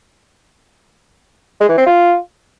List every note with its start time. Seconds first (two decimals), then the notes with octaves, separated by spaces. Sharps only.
1.61 G#3
1.69 E3
1.78 C4
1.86 F4